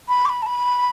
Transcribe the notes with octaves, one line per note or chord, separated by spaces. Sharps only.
B5
D6
B5
A5
B5